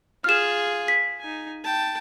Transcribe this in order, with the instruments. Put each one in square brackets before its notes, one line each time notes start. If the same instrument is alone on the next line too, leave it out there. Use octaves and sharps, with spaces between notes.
[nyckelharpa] F4 G#4 [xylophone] F6 E7
[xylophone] B6
[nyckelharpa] D#4 G#5
G5 A5